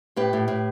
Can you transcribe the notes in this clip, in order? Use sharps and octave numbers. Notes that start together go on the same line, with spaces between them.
A2 G4 B4
A2
A2